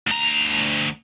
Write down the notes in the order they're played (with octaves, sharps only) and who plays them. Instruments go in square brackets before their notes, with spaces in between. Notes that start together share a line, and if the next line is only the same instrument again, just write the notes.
[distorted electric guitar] D2 A#5